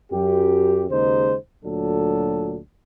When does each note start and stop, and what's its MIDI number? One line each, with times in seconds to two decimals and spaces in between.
0.11 0.85 42
0.11 0.85 67
0.90 1.35 39
0.90 1.35 49
0.90 1.35 56
0.90 1.35 63
0.90 1.35 72
1.64 2.58 38
1.64 2.58 46
1.64 2.58 54
1.64 2.58 62
1.64 2.58 69